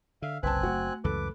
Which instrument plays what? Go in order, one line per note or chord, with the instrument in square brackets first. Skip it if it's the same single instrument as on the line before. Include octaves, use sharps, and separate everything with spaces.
[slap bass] D3 [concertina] E5 F5
[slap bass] F#1 [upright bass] C2 [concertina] C4 G#5 F#6 [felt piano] B4 A5
[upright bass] A3 [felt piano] F#4
[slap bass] C#2 F#2 E3 [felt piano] A4 [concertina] B4 D6